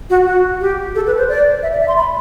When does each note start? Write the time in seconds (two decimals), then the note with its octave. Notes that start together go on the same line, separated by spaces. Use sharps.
0.10 F#4
0.27 F#4
0.61 G4
0.95 A4
1.07 B4
1.18 C5
1.28 D5
1.63 E5
1.72 D5
1.81 E5
1.88 C6
1.97 B5